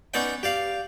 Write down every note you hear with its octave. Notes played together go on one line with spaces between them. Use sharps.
B3 C#4 D#4 D5 D#5 G5
G4 D5 F5